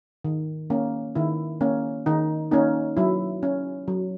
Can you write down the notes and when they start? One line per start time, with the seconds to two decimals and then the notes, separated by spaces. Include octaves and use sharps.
0.25 D#3
0.70 A#3 C#4
1.16 D#3 E4
1.61 A#3 C#4
2.06 D#3 D#4
2.51 A#3 C#4 D#4
2.97 F#3 E4
3.43 C#4
3.88 F#3